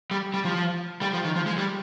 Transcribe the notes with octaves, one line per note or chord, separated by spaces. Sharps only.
G3
G3
F3
G3
F3
D#3
F3
G#3
G3